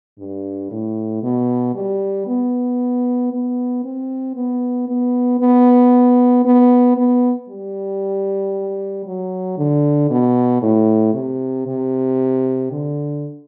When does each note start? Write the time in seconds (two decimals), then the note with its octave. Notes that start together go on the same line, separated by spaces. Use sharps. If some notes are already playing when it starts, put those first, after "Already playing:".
0.19 G2
0.71 A2
1.23 B2
1.75 G3
2.27 B3
3.32 B3
3.84 C4
4.36 B3
4.88 B3
5.40 B3
6.45 B3
6.97 B3
7.49 G3
9.06 F#3
9.58 D3
10.10 B2
10.62 A2
11.14 C3
11.67 C3
12.72 D3